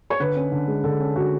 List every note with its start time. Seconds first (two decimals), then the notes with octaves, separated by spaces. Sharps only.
0.10 C#5
0.20 D3 B4
0.36 C#4
0.52 D3
0.67 G#3
0.84 D3 A4
1.00 C#4
1.15 D3 F#4